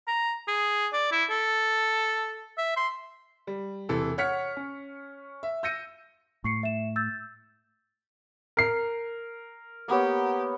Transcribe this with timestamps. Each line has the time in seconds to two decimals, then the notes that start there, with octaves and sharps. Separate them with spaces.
0.07 A#5
0.48 G#4
0.93 D5
1.12 E4
1.30 A4
2.57 E5
2.77 C6
3.47 G3
3.89 E1 C3 E3 A4
4.18 C#5 F#5 F6 B6 C#7
4.57 C#4
5.43 E5
5.63 E6 G6 A#6 C#7 D#7
6.44 A2 C#6 C7 C#7
6.63 E5 E7
6.96 E6 G6 A6
8.57 A#4 C7
9.88 A#3 B3 G4 C#5